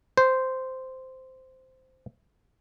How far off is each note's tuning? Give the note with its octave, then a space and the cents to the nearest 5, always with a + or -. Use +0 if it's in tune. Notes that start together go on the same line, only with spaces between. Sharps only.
C5 -10